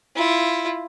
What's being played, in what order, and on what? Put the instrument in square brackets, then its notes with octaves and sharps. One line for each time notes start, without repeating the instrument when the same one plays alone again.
[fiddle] E4 F4